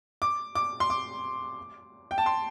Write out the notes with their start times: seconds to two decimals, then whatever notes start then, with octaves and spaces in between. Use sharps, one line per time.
0.22 D6
0.55 D6
0.80 C6
0.90 D6
2.11 G5
2.18 A5
2.26 C6